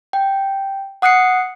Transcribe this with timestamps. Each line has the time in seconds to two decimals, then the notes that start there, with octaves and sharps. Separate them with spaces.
0.13 G5
1.02 F#5 D#6 F#6 C7 C#7